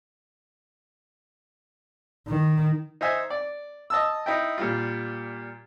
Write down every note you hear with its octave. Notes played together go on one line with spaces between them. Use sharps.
D#3
D#4 C5 E5 G#5
D5
D#5 A5 E6
D#4 E4 G5
A#2 G3 F4